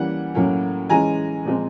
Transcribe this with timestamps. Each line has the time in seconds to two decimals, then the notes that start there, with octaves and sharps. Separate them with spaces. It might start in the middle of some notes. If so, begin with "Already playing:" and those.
Already playing: E3 G3 A#3 C#4 F#5
0.35 A2 F#3 A#3 C#4
0.90 E3 G#3 C#4 G#5 A#5
1.45 A#2 F3 G#3 C4